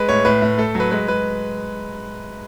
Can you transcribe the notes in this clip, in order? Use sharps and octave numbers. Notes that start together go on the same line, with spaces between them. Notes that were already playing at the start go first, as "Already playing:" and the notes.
Already playing: G#3 B4
A2 C#5
A2 B4
A2
A3 A4
F#3 B4
G#3 B4
G#3 B4